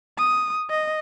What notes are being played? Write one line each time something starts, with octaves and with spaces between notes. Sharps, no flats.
D#6
D#5